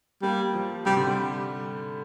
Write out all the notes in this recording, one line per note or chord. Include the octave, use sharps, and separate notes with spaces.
G3 A#3
F3
C3 G3
D3
G3